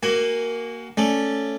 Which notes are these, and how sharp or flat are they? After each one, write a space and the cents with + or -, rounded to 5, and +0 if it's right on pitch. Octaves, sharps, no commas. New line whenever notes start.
A#3 +0 F#4 +30 G#5 +0
A3 +0 C#4 +0 D5 +0